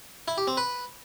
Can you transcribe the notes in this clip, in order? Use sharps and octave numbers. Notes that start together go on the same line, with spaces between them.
E4
G4
C4
B4